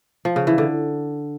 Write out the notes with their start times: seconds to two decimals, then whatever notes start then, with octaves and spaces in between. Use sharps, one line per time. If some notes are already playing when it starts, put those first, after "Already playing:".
0.25 F3
0.36 C#3
0.47 E3
0.58 D3